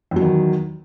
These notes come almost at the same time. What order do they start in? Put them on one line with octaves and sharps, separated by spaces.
E2 F#3 D#3